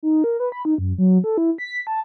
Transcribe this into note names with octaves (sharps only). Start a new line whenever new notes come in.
D#4
A#4
B4
B5
D#4
F#2
F#3
A4
E4
B6
A5